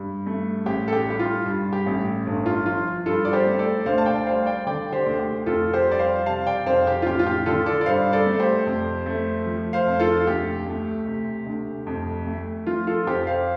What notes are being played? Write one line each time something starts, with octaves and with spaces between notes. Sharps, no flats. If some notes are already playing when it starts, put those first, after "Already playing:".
Already playing: G2
A3
A1 G4
A4
G4
G3 G4
F4
G2
G4
A1
G1
F4
F3 F4
G2 F4 A4
D5
G4 C5
A3
A4 D5
D2 C5 F5
A5
D5 G5
G3 C5 F5
D5 G5
D3 D5 G5
G4 C5
D2
G4
F2 F4 A4
G4 C5
G3
D5
C5 F5
C3 F5 A5
D5 G5
F2 C5 F5
G4
F4
A1 G4
F4
G4
D3 F4 A4
A4 D5
D5
G2 C5 F5
A4 D5
A3
G4 C5
F2
A3
F3
C5 F5
F2
F4 A4
D2 G4
A3
C3
D2
F2
A3
F3 F4
F4 A4
F2 G4 C5
C5 F5